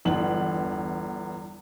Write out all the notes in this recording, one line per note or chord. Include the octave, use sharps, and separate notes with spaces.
G1 E2 F#7